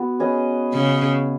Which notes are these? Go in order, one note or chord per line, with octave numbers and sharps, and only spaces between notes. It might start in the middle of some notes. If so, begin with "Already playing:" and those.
Already playing: B3 F#4
C#4 G#4 B4 D#5
C#3